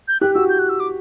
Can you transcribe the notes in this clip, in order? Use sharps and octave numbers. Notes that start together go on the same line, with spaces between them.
G6
G4 F#6
F#4 E6
G6
F#6
E6
D6